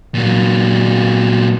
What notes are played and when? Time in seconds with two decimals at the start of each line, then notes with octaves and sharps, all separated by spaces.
0.15 A#2 F#3